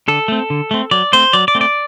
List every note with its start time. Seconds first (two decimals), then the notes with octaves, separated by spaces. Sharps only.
0.08 D3 A4
0.28 A3 C4
0.50 D3
0.71 A3 C4
0.91 F#3 D5
1.13 A3 C4 C5
1.33 F#3 D5
1.48 D5
1.55 A3 C4
1.61 D5